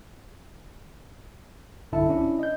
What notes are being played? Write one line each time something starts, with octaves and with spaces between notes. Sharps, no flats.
B1 G2 D3 E4 E5 A5
C#4 D4 E4
D#5 G6